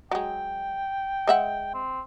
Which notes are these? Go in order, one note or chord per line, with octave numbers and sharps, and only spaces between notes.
F#3 G#3 G5
G#3 E5 F#5
C4